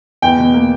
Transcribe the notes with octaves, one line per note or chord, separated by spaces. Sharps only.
E2 G5
B2
A#3